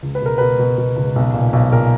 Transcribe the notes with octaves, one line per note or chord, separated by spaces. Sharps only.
C#2
B4
B2 A#4
B2 B4
B2
B2
C#2
B1
A#2
B1
A#2 A#4